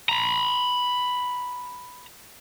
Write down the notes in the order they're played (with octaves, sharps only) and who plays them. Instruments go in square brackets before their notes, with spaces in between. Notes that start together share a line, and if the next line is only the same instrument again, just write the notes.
[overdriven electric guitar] A#5 B5